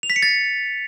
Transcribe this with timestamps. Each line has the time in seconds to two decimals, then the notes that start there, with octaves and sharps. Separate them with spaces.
0.03 F7
0.10 B6
0.16 C#7
0.23 A6